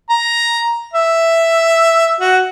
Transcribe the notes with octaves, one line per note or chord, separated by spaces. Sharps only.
A#5
E5
F#4